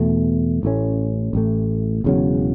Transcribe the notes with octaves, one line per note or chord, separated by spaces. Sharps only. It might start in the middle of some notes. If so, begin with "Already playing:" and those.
Already playing: E2 B2 A3
A1 A2 A3 C#4
A1 A2 A3
E1 E2 C#3 F#3